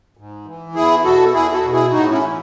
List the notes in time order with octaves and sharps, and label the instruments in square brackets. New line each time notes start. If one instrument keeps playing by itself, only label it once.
[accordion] G#2
E3
E2 E4 G#4
B2 F#4 A4
E2 E4 G#4
F#4 A4
B2
E4 G#4
A2 D#4 F#4
C#4 E4
E3